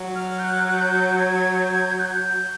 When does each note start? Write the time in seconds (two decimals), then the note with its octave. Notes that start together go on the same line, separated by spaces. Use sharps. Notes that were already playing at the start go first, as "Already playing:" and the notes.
Already playing: F#3
0.15 F6
0.39 G6
0.44 F#6
0.68 F#6
0.74 G6
1.18 G#6
1.62 G6
1.73 G#6
1.85 G6
2.00 F#6
2.06 G6